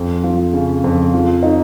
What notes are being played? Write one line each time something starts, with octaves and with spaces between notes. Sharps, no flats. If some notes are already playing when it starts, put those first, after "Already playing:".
Already playing: F2
F3
C#3
F2
F3
D#4